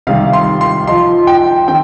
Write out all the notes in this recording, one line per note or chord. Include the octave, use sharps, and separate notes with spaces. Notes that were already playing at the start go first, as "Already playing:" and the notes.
C3 D#3 G3 F5
C6
C6
F3 D#4 C6
G5
D#3 C4 G5